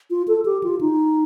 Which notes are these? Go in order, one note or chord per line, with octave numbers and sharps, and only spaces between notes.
F4
A4
G4
F4
D#4